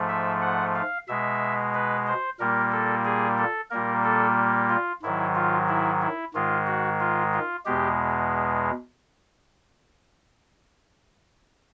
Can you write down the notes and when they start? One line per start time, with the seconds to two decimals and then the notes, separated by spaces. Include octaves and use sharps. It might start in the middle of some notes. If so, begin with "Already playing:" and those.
Already playing: G#2 F3 A3
0.09 E5
0.42 F#5
0.75 F5
1.08 B2 G#3 E5
1.74 B4
2.07 C5
2.40 A#2 G3 A#3 A#4
2.72 A4
3.05 G#4
3.38 A4
3.70 A#2 G3 A#3 A#4
4.04 A4
4.69 F4
5.02 G#2 D#3 F#3 E4
5.35 F4
5.68 E4
6.02 E4
6.34 G#2 D#3 G#3 F4
6.67 F#4
7.00 F4
7.33 F4
7.66 E2 B2 G#3 G4